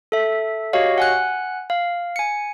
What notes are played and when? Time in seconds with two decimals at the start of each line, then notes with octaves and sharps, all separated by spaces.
0.12 A4 E5
0.73 F#4 G4 C#5 D#5 F5
0.98 F#5 G#5 F#6
1.70 F5
2.16 G#5 C#7